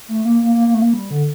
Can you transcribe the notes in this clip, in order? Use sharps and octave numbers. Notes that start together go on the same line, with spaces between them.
A3
A#3
A#3
A#3
A#3
A3
A#3
G3
D3